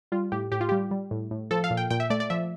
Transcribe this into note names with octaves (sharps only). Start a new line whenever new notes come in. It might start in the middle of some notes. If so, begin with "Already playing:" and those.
G3 F4
A2 G4
A2 G4
F4
G3 G4
G3
A2
A2
F3 A4
F5
A#2
G5
A#2 G5
E5
A3 D5
D5
F3 E5